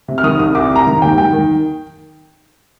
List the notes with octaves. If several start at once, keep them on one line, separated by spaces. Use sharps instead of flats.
C3
F6
D#3 D#6
C2 D#6
C2 D6
C3
A#5
D#3
D#2 G5
D#3 G5
D#3